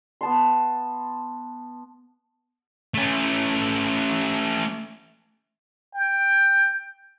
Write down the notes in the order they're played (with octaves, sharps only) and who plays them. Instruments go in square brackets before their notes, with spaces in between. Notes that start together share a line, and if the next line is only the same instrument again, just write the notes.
[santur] B3 A5 C6
[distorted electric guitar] A3 C#4
[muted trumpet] G5